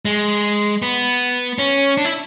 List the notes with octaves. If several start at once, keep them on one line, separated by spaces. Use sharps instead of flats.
G#3
B3
C#4
D4
E4